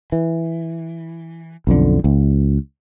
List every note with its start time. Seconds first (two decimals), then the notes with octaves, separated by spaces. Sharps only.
0.12 E3
1.67 B1 F2 D3
2.04 C#2